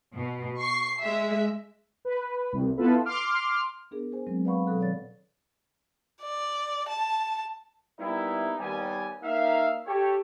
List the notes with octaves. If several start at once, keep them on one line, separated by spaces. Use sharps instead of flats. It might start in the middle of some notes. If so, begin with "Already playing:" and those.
B2
C#6 C7
G#3 E5
B4
C2
B3 E4 F4 A4 B4
C6 D6 F6
B3 D4 G#4 A#4
G#4 C5 G#5
F#3 G#3 C4
B4 D5 F5 F#5 B5 C#6
B2 F#3 A4 F#6
D#3 C#5 D5 A6
D5
A5
G3 A#3 B3 D#4 E4
D#2 G3 B3 G#5
A#3 D#4 E5 F5
G4 A4 C#5